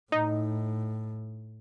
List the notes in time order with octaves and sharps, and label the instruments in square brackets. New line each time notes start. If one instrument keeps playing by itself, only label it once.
[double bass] A2 [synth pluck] D#4